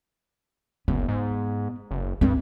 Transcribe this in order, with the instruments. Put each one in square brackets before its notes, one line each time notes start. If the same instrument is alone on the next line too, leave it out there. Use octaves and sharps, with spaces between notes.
[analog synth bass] F#1 [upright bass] B3
[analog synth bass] G#2
F#1
[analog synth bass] G2 [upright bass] A3 C4